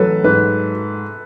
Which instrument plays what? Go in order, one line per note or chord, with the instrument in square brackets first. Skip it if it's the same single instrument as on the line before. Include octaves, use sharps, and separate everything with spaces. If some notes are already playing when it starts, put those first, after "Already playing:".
Already playing: [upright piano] A1 F#3 [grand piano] A4 B4
[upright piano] G#2 [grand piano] B4